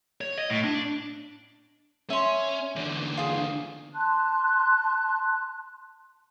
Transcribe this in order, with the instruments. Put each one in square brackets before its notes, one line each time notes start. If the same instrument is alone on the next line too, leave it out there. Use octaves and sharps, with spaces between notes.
[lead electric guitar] C#5
D#5
A2
D4
[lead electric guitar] C#4 [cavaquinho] E5 C6
[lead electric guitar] E2 D3
[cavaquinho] F4 G#4
[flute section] A5 C6 F#6